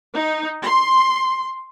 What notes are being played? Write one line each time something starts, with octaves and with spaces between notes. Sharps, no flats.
D#4
C6